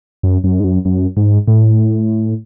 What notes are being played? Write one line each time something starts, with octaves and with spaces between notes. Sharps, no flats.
F#2
F#2
G#2
F#2
F#2
G#2
A2